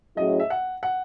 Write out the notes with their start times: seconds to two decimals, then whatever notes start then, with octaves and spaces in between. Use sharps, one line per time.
0.17 A2 F#3 C#4 E4 G#4 D#5
0.40 E5
0.50 F#5
0.83 F#5